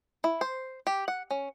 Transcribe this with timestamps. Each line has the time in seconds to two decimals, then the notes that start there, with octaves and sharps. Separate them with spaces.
0.24 E4
0.41 C5
0.87 G4
1.08 F#5
1.30 C#4